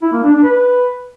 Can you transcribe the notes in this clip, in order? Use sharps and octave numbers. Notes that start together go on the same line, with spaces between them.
E4
A#3
D4
D4
B4